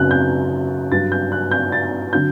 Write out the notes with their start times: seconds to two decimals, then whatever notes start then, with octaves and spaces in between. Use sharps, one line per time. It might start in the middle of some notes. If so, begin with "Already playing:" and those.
Already playing: F#2 C#3 F#3 F#6
0.11 G6
0.92 G2 F#3 A6
1.12 G6
1.32 F#6
1.51 G6
1.72 A6
2.13 D3 F#3 G6